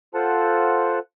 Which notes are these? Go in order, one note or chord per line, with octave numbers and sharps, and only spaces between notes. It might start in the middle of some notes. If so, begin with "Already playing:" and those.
F4 A4 C5 F#5 A5